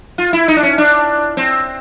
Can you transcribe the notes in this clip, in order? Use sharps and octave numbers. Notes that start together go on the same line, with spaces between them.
F4
E4
D#4
D4
C#4
D4
C4